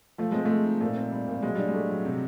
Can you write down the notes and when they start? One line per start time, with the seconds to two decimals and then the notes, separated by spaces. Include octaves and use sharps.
0.18 F3 A3
0.32 G#3 C4
0.45 A3
0.50 G#3
0.66 D#4
0.81 A#2 A3
0.97 C4
1.12 G3
1.28 A#2
1.42 F#3 G#3
1.55 G3 D4
1.68 G#3
1.74 A3
1.90 F#3
2.05 C3